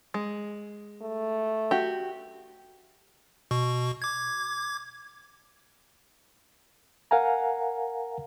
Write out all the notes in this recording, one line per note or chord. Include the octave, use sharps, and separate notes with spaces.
G#3
A3
F#4 G4
B2 C#6
D6 G#6
A#4 F5 F#5 G#5 A#5